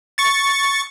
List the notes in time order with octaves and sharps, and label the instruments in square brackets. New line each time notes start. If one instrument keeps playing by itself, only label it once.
[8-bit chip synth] C#6 A6